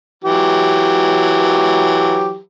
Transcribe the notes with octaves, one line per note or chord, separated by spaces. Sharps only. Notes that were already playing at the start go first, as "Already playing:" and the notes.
E3 F#3 G4